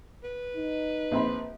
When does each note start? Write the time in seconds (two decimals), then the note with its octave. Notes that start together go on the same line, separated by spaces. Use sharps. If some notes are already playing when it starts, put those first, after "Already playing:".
0.23 B4
0.57 D#4
1.11 A#1 C4 B5